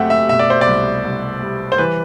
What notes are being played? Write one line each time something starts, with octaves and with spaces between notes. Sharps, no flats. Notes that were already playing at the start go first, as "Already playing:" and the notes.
Already playing: F#2 A3 C4 G4 E5 F#5
E5
B2 E5
D5
C5
D5
C2
C2
G3
C5
E3 B4